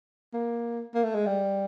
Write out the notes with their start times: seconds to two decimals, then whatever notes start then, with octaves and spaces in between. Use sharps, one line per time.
0.33 A#3
0.94 A#3
1.04 A3
1.15 G#3
1.26 G3